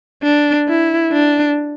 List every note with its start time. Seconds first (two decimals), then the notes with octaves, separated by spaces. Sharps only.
0.23 D4
0.68 E4
1.13 D4